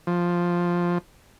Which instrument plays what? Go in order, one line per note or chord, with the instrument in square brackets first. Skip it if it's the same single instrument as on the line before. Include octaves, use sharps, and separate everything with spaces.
[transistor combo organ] F3